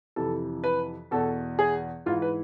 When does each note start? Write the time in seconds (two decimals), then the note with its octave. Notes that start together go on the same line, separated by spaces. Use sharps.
0.16 F2 C3 E3 A4
0.64 B4
1.11 E2 B2 A4
1.59 G#4
2.06 G#2 E3 F4
2.22 B4